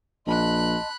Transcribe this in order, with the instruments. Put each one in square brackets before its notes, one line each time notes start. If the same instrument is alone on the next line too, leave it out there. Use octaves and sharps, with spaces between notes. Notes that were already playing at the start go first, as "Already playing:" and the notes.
[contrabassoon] A#1 [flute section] D#5 A5 C6 [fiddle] B5 F#6